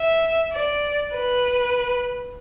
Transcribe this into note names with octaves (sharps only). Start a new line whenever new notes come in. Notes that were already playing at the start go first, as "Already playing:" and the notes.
Already playing: E5
D5
B4